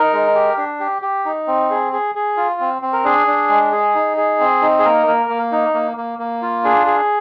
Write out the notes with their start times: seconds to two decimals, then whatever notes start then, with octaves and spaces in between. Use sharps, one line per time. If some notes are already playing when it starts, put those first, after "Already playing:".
Already playing: D#4 A#4
0.13 G#3
0.35 G4
0.58 D4
0.80 G4
1.02 G4
1.25 D#4
1.47 C4
1.70 G#4
1.93 G#4
2.15 G#4
2.37 F4
2.60 C4
2.82 C4
2.93 A#4
3.04 D4 G#4
3.27 D4
3.49 G#3
3.72 G#4
3.95 D#4
4.17 G#4
4.40 C4
4.62 D#4
4.79 G#4
4.84 A#3 A#4
5.07 A#3
5.30 A#3
5.52 D#4
5.74 A#3
5.97 A#3
6.19 A#3
6.42 F4
6.64 D4 G#4
6.86 G#4